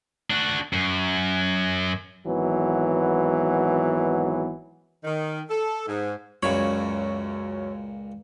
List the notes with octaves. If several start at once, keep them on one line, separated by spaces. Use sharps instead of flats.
D4 F#4
F#2
G#1 E3 F#3 B3
D#3
A4
G#2
C#2 F#2 A#2 C#5 B5